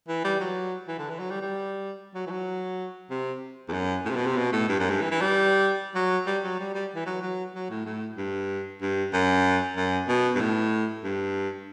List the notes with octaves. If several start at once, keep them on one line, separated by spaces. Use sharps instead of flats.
E3
G3
F#3
E3
D3
E3
F#3
G3
G3
F#3
E3
F#3
C3
E2
F#2
A2
C3
B2
C3
B2
A2
G2
F#2
G2
E3
E3
G3
F#3
G3
F#3
G3
G3
E3
F#3
F#3
F#3
A2
A2
G2
G2
F#2
F#2
B2
G2
A2
G2